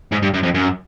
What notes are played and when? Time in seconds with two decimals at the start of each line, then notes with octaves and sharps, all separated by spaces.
0.12 G#2
0.22 G2
0.34 F#2
0.43 F2
0.54 F#2